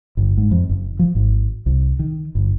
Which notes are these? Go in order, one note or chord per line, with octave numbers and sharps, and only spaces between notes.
G1
G#2
F2
F#1
F3
G#1
C2
D#3
G1